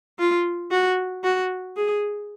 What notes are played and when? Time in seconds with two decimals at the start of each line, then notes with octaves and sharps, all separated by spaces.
0.19 F4
0.71 F#4
1.24 F#4
1.76 G#4